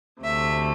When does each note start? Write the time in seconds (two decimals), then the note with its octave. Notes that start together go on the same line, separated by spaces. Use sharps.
0.24 D2 C3 A3 E5